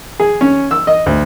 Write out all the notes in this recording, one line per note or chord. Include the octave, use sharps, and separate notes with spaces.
G#4
C#4
E6
D#5
D2